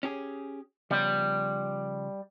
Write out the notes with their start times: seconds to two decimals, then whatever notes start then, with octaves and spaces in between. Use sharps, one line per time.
0.03 C#4 G4 G#4
0.91 C#3 F3 G3 B3